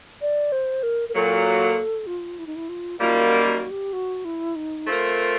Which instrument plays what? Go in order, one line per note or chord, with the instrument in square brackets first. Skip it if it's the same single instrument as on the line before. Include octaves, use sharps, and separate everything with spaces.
[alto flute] D5
C5
A#4
A#4
[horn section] A#2 F#3 A#3 [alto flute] A4
[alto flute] F4
E4
D#4
E4
F4
[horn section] F#2 D#3 G3 A#3 [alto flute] F4
[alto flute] F#4
F#4
G4
F#4
E4
D#4
[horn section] A3 C4 F4 A#4